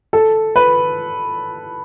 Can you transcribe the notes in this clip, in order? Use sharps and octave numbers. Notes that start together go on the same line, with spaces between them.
A4
B4